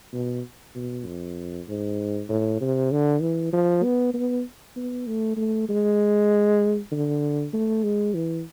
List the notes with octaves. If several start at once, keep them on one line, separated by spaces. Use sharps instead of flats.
B2
B2
F2
G#2
A2
C3
D3
E3
F3
B3
B3
B3
A3
A3
G#3
D3
A3
G#3
E3